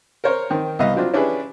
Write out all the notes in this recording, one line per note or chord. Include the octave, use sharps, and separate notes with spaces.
A#4 C5 C#5
D#3 C4
C2 B3 D#5 F5
F#3 C4 D4 F4
C#4 D4 E4 G4 G#4 B4